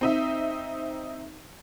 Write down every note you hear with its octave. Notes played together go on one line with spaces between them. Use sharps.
C4 D#4 E5